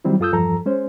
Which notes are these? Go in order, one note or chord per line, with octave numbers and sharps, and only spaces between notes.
D#3 F#3 G3 C4 E4
F#2 F4 A4 D#6 E6 G6
E2 G2 F3 A4 A#5
G#3 C#4 C5